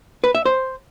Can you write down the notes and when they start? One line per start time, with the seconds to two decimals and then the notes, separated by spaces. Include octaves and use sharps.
0.24 B4
0.35 E5
0.46 C5